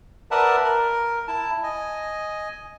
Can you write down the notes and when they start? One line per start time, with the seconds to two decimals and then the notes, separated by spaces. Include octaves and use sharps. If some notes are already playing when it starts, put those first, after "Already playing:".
0.31 A#4 B4 D5 E5 F#5 A5
0.65 A#4
1.28 E4 A5
1.63 D#5 G#5